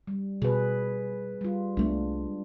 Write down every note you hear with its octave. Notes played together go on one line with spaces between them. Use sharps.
G3
B2 G#4 B4
G3 F4
C2 G#3 A3 B3 D4